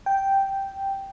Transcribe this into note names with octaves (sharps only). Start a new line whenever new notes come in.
G5